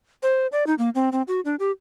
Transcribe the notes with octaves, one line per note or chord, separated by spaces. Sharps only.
C5
D5
D#4
A#3
C4
C4
F#4
D4
G4